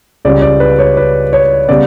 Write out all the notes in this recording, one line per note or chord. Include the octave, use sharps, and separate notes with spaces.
C#2 C#3 G3 C#4 D5
D5
B4
C#5
B4
C#5
C#3 G3 B3 D5